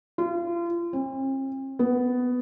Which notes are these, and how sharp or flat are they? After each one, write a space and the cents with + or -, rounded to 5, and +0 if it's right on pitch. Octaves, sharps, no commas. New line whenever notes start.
F4 -35
C4 +45
B3 +10